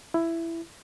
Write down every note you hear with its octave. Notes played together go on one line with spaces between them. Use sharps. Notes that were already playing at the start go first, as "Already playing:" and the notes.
E4